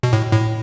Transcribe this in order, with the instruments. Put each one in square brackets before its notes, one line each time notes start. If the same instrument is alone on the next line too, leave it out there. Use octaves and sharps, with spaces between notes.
[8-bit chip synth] B2
A2
A2